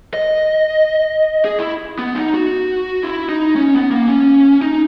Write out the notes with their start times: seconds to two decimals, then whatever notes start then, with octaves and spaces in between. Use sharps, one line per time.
0.14 D#5
1.45 G#4
1.59 E4
1.99 B3
2.15 D#4
2.34 F#4
3.03 E4
3.29 D#4
3.56 C#4
3.74 B3
3.91 A#3
4.08 C#4
4.62 D#4